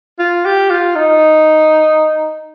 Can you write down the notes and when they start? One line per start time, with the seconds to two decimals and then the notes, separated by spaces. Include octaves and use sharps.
0.19 F4
0.46 G4
0.71 F4
0.96 D#4